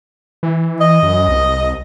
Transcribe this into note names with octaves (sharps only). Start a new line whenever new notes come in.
E3
D#5
F#2
C2